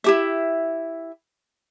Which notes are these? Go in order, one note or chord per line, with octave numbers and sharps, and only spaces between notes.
E4 G4 E5